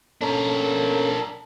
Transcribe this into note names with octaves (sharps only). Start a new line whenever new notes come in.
A#3 C#4 D4 A4 A#4